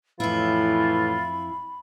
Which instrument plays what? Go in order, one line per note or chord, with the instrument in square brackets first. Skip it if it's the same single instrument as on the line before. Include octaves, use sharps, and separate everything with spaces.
[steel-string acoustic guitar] F2 E4 [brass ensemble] A2 E3 [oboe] F4 [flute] B5